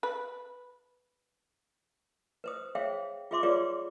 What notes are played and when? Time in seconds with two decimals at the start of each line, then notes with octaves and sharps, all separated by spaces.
0.03 B4
2.44 B4 C5 D#6
2.75 G#4 C5 C#5 E5 F5 G5
3.31 F4 G#4 C5 E5 C6 D6
3.43 F4 G4 G#4 B4 C#5 D5